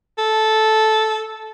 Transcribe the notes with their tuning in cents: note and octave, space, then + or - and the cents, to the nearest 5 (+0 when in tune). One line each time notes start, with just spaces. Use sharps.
A4 -10